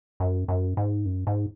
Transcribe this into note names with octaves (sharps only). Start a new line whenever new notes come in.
F#2
F#2
G#2
F#2
G#2